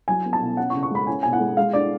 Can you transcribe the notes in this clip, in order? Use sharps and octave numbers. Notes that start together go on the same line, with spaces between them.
F#3 G#5
B3
A5
B2
C#4 F#5
C#6
C#3
C#6
G#3 B5
C#4 G#5
B2 G#5
F#5
G#3
G#3 F5
D4 D5